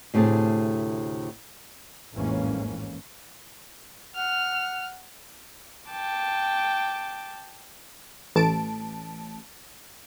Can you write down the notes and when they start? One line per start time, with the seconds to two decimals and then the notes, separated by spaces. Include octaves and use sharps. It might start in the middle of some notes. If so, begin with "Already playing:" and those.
0.14 D2 A2 C3 G#4 A5
2.14 A1 F2 G#2 E3 A#3 C#4
4.16 F#5 F6
5.90 G5 A5 D6
8.36 A1 A5 D7